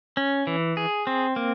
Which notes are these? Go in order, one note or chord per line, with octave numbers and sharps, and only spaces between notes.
C#4
E3
G#4
C4
A#3